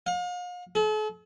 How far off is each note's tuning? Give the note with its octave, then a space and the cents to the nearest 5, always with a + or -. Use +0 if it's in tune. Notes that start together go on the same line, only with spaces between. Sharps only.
F5 +40
A4 -45